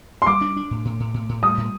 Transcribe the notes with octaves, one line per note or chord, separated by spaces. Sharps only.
C6
G3 D6
D4
D4
A2
A2
A2
A2
A2
G3 D#6
A2